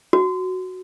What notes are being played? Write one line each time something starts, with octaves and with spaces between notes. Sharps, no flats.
F#4